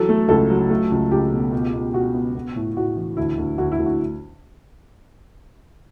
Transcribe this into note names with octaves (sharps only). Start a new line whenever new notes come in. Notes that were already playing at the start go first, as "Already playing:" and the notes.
Already playing: E3 F#3 A4
A3
C#2 A4
F#3
A3
C#2
C#2 G4
B2
B2
B2
B2 F#4
B3
B3
A2
A2 F#4
E3
D2 E4
D2
D2 F#4
E4
D2
F#4